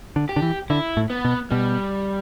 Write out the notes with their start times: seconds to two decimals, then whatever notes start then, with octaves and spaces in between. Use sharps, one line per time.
0.16 D3
0.29 G4
0.36 D3
0.42 E3
0.70 D3 E4
0.97 A2
1.10 B3
1.25 B2
1.51 B2 G3